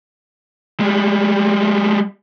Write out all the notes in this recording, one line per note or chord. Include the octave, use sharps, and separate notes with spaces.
G3 G#3